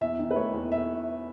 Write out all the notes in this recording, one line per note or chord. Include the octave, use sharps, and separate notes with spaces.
E2 E5
D#3
B4
A3 C#5
E2
E5